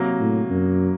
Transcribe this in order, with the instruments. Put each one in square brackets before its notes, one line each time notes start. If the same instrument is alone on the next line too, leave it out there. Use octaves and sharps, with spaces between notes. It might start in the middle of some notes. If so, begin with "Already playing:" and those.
Already playing: [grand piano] C3 F#3 A#3
[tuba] A2
F#2